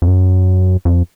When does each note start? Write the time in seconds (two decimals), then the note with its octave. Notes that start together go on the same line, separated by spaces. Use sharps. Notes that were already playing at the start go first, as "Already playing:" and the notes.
0.02 F2
0.08 F#2
0.85 F2